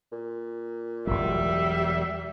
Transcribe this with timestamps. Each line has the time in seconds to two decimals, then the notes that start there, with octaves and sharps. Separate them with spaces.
0.12 A#2
1.07 E1 C2 F#3 G3 E5